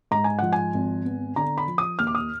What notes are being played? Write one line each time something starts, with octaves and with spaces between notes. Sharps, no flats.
G#2 A#5
G#5
F3 F#5
G#5
G#1
B3
D3 A#5
B5
F3
D#6
D#2 F6
D6
D#6